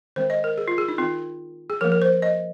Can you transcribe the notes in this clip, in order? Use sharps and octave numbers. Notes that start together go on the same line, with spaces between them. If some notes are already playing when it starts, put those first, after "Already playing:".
D#3 G#3 C4 C5
D#5
A#4
G#4
F4
G#4
D#4
D#3 C4 F4
G#4
F3 A#3 A#4
A#4
C5
D#5